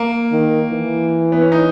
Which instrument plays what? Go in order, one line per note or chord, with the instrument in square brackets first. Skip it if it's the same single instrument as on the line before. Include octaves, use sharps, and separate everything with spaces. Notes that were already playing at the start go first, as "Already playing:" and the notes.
Already playing: [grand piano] A#3
[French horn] D#3
E3
[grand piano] B3
C#4
D#4